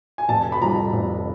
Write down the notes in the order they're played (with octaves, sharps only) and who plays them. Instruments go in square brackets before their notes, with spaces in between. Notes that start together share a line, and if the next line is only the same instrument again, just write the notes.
[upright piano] G#5
F1 A5
B5
F2 C3 D#3 G3 A#5
F1